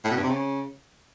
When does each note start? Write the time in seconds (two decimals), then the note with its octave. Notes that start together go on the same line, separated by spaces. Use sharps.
0.04 A2
0.11 B2
0.17 G2
0.23 C3
0.29 C#3